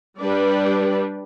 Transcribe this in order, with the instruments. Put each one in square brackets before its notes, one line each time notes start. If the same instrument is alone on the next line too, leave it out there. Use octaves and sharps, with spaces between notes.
[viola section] G3 D4 B4 D5